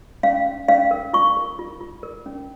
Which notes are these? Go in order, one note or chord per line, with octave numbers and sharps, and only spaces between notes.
C#4 F5
C#4
C#4 F5
A#4
F4 C#6
A#4
F4
F4
A#4
C#4